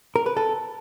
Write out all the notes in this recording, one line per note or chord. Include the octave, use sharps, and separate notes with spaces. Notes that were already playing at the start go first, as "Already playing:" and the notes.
A#4
B4
A4